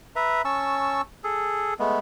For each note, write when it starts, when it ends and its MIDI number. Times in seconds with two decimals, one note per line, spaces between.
0.16 0.42 71
0.16 0.42 76
0.16 0.42 82
0.45 1.02 61
0.45 1.02 81
0.45 1.02 85
0.45 1.02 88
1.24 1.74 68
1.24 1.74 69
1.79 1.99 56
1.79 1.99 57
1.79 1.99 59